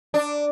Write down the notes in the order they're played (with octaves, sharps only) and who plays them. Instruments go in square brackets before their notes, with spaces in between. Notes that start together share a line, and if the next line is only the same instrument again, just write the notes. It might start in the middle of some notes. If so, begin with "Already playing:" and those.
[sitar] D4